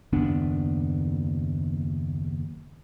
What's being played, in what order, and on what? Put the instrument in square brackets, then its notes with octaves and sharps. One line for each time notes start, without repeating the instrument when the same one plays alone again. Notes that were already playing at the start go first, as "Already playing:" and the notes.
[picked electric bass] F#1 D#2 B3 D4